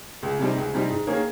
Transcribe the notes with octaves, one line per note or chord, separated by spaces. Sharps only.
C#2
C3 G3 C4 D#4
C#2
C3 G3 C4 D#4
G#2
D#3 A#3 C#4 G#4